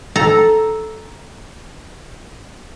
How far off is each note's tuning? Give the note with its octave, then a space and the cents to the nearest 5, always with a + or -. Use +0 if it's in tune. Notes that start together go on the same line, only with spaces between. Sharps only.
A4 -5 A#5 +0